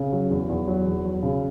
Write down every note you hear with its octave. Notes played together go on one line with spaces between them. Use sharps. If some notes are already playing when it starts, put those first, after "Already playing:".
Already playing: C#3
F#3
E2
E2
F#3
E2
F#3
C#3